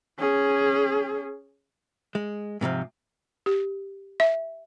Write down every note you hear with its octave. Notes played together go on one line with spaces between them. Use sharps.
C#4 G#4
G#3
G#2 C3 E3 F3
G4
E5